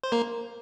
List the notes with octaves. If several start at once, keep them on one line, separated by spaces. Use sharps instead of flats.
C5
A#3 A#4